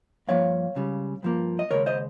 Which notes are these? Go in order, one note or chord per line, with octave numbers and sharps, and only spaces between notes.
G2 F3 A#3 C#5 F5
C#2 C#3 G3
G2 F3 A#3
D#5
D#2 C#3 G#3 A#4 C#5
C5 D#5